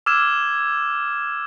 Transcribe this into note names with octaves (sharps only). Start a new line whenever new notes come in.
D6 E6 F6 G#6 E7